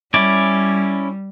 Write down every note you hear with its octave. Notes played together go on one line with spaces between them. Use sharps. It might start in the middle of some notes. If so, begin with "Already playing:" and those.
G3 C#4 E4 D5